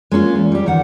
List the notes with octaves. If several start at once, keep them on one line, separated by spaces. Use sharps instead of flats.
G#3 A#3 C#4 F4
E2
G3 G4
E2 D#3 F#5